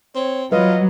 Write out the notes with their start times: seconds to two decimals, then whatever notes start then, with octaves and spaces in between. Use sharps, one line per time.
0.15 C4 C#5
0.52 F#3 F4 B4 D#5